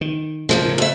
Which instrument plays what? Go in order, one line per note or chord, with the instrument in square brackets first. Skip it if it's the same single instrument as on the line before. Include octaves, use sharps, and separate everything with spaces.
[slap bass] D#3
[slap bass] F#2 C#3 [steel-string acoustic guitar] F3 G#3 A#3
[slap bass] A2 C#3
[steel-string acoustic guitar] F2 E5